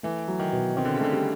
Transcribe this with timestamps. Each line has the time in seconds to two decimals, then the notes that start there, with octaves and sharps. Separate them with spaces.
0.03 E3 A3
0.28 F#3
0.39 D#3
0.52 B2
0.76 D#3 C4
0.85 D3
0.94 C#3
1.00 D3 A3
1.12 G3